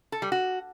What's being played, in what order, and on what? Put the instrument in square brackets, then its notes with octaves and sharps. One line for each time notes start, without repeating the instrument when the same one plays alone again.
[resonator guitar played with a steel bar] A4
G3
F#4